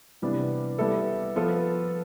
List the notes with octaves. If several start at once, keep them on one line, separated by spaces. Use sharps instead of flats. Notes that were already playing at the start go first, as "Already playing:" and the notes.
C3 E3 G3 B3 D4
G3 B3 E4 A4
F3 B3 F4 A4